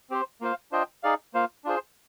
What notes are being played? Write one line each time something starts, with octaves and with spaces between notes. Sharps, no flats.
C4 G4 C5
A#3 F4 C5 F5
D4 F4 C5 D#5 G5
D#4 G#4 D5 F5
A#3 F4 C5 F5
D4 F4 G#4 C5